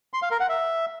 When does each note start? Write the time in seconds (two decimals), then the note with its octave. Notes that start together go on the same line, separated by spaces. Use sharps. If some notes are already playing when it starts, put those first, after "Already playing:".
0.13 C6
0.22 F5
0.31 A#4
0.40 F#5
0.49 E5